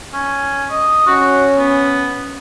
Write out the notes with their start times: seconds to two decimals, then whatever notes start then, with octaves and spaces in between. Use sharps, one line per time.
0.13 C#4
0.71 D#5
1.07 C#4 F#4
1.57 B3